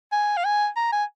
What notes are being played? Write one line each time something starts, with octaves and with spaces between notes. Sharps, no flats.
G#5
F5
G#5
A#5
G#5